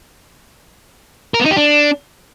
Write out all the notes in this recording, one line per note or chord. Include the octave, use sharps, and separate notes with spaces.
A#4
B3
D#4
G4
D4